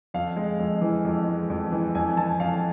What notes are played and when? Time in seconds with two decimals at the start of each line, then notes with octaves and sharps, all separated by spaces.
0.14 F2 F5
0.36 G#3
0.59 F2
0.81 E3
1.05 F2
1.27 G#3
1.50 F2
1.72 E3
1.95 F2 G#5
2.17 E3 A5
2.40 F2 F5